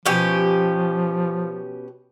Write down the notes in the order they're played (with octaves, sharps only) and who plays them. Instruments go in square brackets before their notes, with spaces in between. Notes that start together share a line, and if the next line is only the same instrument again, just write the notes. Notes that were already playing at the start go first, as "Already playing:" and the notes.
[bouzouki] B2 C#4 G4 [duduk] F3